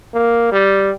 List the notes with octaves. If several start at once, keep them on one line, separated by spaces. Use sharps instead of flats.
A#3
G3